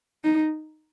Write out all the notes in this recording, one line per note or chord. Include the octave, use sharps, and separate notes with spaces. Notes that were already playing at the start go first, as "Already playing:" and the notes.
D#4